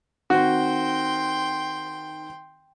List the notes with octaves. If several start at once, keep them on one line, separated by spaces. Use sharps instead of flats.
D#3 C4 F#4 G5 C6